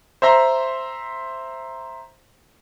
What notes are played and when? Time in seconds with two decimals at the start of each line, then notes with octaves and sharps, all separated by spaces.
0.22 C5 E5 A#5 C6